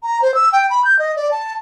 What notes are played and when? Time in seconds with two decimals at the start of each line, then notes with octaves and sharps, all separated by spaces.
0.03 A#5
0.22 C5
0.35 E6
0.53 G5
0.70 B5
0.85 G6
0.99 D#5
1.16 D5
1.31 A5